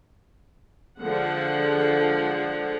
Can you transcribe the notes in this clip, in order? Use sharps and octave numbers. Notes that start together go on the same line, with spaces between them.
D3 F3 G#3 F#5